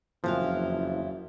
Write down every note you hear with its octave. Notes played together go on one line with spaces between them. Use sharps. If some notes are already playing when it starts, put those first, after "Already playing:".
F#1 F2 E3 F3 F5